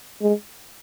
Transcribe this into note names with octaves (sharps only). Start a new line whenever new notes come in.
G#3